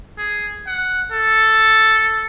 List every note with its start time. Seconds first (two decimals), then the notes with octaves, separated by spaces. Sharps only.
0.18 G#4
0.67 F#5
1.13 A4